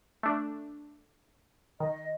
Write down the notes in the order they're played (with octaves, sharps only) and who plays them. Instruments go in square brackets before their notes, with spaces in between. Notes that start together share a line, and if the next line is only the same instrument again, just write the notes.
[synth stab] A3 D4
[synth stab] D#3 [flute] D#5